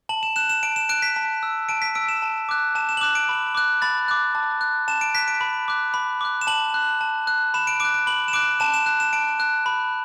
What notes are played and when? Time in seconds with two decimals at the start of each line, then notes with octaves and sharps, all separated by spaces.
0.09 A5 F#7
0.23 E7
0.36 F#6 E7
0.50 E7
0.63 A5 D7
0.76 E7
0.89 F#6 D7
1.02 B6
1.16 A5 B6
1.43 E6
1.69 A5 D7
1.82 B6
1.95 E6 D7
2.09 E7
2.22 A5
2.49 D6 F#6
2.75 A5 E7
2.89 E7
2.97 F#7
3.01 D6 F#6 E7
3.15 D7
3.29 B5
3.55 D6 F#6
3.82 B5 A6
4.08 D6 F#6
4.35 A5
4.61 F#6
4.88 A5 E7
5.01 D7
5.15 F#6 B6
5.28 D7
5.41 B5
5.68 D6 F#6
5.94 B5
6.21 D6 F#6
6.41 E7
6.47 A5 F#7
6.74 F#6
7.01 A5
7.27 F#6
7.54 B5 E7
7.67 D7
7.80 D6 F#6 D7
7.94 D7
8.07 B5 F#7
8.28 E7
8.33 D6 F#6 D7
8.60 A5 E7
8.74 E7
8.86 F#6
9.00 E7
9.13 A5 D7
9.40 F#6
9.66 B5